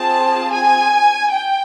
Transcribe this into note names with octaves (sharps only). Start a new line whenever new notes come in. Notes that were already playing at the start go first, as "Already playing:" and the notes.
Already playing: C4 F4 G#4 A5
G#5
G5